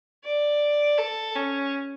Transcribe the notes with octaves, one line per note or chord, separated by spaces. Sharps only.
D5
A4
C#4